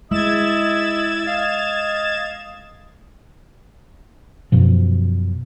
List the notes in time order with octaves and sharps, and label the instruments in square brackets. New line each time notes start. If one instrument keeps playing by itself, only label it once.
[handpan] G#3 [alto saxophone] E4 [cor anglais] D#5 [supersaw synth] G#6 A6 E7
[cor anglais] D#5 [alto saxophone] F5
[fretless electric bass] F#2 B2 F3